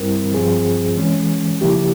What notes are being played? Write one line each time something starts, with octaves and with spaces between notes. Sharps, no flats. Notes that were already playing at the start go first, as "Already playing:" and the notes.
Already playing: G2 G3 C4 E4 A#4
G2 F3 C4 F4 G#4
E3 G#3 C#4
C#3 F3 A#3 E4 G4